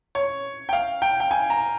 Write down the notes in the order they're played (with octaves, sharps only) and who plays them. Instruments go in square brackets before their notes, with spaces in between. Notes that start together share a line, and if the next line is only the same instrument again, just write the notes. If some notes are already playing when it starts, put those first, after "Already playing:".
[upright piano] C#5
G5
F5
G5
G5
G#5
A#5